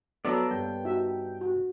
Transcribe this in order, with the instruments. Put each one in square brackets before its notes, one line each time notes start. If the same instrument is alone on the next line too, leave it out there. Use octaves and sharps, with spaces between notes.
[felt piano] F#3 [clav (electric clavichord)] B3 D4 C#5 [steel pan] A4 [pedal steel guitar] D5 E5 A#5
[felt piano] G2 [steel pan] A#3 [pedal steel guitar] G5
[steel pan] D#4 F#4 E5
F#4